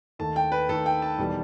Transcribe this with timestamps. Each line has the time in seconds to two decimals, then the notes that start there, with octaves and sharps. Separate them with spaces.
0.19 D#2 D#3 A3 A5
0.36 G5
0.52 B4
0.69 D#2 D#3 A3 A4
0.86 G5
1.02 A5
1.18 E1 E2 D#3 G3